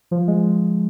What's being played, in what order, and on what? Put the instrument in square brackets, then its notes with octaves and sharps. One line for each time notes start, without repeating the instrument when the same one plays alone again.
[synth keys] F3
G#3